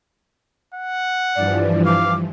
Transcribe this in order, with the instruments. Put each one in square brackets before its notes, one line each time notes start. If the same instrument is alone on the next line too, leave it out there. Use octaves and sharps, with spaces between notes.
[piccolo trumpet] F#5
[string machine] G2 E3 F3 [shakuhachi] D5
[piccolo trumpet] F5 [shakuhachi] D6